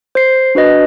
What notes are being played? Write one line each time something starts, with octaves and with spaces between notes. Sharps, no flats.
C5 C7
D4 F#4 B4 D#5